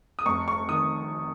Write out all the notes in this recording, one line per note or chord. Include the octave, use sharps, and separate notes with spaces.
D#6
F1 C#6
C#6
D#3 D#6